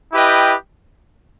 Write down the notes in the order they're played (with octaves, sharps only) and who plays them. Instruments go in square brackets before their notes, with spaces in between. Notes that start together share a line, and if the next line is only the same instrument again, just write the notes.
[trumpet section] E4 G4 B4 D#5 G5